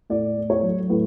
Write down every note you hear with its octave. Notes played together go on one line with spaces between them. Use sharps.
A2 D5
A3
C#5
F#3
A2 B4